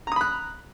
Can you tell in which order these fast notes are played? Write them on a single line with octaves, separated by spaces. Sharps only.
A#5 D#6 B5 F#6